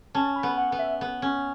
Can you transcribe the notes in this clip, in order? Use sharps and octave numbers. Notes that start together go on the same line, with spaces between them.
C#4 A5
B5
B3
F#5
B3
E5
B3
C#4